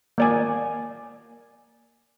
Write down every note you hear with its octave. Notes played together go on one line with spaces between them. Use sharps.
A#3 D5 G#5